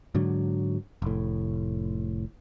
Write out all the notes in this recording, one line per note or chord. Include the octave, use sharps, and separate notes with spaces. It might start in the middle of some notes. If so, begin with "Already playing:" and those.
G#2 D3 F#3
F1 A2